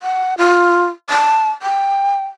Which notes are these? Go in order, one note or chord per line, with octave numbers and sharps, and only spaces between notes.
F#5
F4
A5
G5